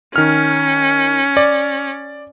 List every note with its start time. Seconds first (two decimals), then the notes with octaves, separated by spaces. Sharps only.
0.16 D#3 C#4 F6
1.37 D5